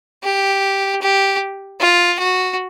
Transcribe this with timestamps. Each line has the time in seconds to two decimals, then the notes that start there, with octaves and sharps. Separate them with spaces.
0.24 G4
1.02 G4
1.80 F4
2.19 F#4